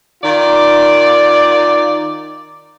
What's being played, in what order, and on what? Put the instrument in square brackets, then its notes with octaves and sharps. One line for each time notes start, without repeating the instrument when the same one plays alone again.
[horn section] D#3 F4 D5